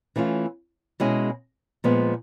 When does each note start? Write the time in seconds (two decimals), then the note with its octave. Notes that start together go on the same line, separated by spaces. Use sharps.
0.16 E3 A3 C#4 F4
1.00 B2 G#3 C#4 E4 G#4
1.84 A#2 F3 G#3 B3